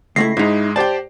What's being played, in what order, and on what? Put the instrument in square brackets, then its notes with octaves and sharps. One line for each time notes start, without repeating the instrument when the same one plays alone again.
[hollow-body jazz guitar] C#2 A3 E4 [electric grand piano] A#6 C7
[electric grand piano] G#2 G#3 [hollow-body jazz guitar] D#4 E4
[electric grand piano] G4 C5 D5 [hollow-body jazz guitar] G5 A5